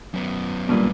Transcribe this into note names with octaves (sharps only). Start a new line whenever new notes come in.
F#2 B3
G2 A#2